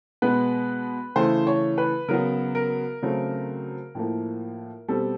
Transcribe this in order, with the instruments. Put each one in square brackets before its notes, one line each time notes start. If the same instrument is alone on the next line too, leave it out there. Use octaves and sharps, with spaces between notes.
[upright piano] B2 G#3 B3 B4
C#3 E3 A3 C5
C#5
B4
C#3 F#3 B3 A#4
A#4
C#3 F#3 A3 C4
A2 F3 A#3
B2 G3 C4 A4